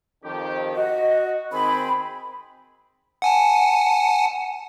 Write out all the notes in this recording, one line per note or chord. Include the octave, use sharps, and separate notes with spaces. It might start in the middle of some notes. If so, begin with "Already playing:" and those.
F2 D#3 G4
F#4 D#5
D#3 C4 G#4 B5
F#5 G#5 A5